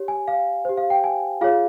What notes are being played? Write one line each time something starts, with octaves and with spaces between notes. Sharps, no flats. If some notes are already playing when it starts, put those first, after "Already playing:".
Already playing: G4 C#5
G#5
F5
G4 C5
F5
G5
G#5
F4 G#4 C#5 F5